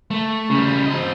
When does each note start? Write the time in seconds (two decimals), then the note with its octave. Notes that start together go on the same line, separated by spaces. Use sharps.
0.11 A3
0.50 C#3 G3
0.86 C4 D#5